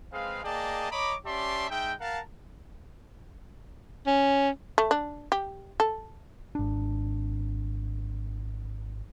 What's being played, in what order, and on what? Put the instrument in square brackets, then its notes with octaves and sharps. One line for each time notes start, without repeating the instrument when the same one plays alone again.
[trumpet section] G#3 C4 G#4 B4 F5
A#3 G#4 D5 D#5 G5 A5
C#5 D#5 A#5 B5 D6
C#4 G4 D5 E5 A5 C6
G#3 D#4 E5 G5
A#4 F5 F#5 A5
[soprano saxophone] C#4
[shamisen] A3
D4
G4
A4
[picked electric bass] G#1 D4